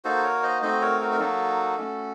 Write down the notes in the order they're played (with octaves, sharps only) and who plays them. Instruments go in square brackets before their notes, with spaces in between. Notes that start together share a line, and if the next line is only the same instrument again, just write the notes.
[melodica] A#3 D#4 F#4 A4 C5
A#4 C#5
C5 D#5
A3 C4 D#4 F#4 C5 D#5
A#4 C#5
F#4 A#4
A#4
F#3 A#3 D#4 F#4 A4
A3 C#4 F#4